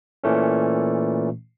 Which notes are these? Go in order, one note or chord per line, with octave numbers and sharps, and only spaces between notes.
A#2 E3 A3 C#4